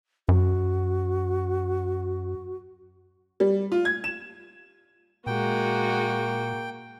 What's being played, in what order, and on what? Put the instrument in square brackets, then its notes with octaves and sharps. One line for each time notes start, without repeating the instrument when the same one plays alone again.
[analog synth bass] F#2 [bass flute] F#4
[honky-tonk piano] G3
F4
G#6
E7
[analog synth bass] A#2 [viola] G#3 F#4 [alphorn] A#3 [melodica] G5